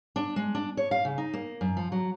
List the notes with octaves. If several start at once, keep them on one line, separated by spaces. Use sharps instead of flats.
D4
G#3
D4
C#5
F5
C#3
D#4
A#3
F#2
F3
F#3